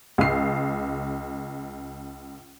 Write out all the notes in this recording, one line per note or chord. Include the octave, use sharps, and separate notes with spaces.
C#2 C7